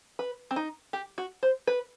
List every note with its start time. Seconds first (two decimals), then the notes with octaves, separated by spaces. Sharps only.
0.19 B4
0.51 C4
0.56 D#4
0.93 G4
1.18 F#4
1.43 C5
1.67 B4